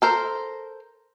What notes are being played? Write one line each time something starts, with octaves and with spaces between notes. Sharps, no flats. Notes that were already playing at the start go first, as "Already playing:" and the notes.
A4 A#4 C5